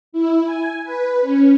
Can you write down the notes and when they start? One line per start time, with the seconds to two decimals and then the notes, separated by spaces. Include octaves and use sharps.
0.12 E4
0.45 G#5
0.84 B4
1.22 C#4